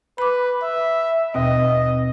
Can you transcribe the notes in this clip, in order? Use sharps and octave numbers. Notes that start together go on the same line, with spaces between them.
B4 B5 D6
E5
D#2 B2 C4 D#5